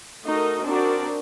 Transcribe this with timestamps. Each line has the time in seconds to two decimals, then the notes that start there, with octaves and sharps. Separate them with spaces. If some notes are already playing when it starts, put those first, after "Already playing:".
0.25 A3 D#4 F#4 A#4 D#5
0.64 C4 D4 D#4 F#4 A#4 D5